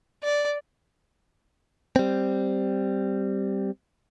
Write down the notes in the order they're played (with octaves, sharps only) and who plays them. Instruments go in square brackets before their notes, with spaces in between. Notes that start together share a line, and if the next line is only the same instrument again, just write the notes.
[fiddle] D5
[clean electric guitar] G3 C4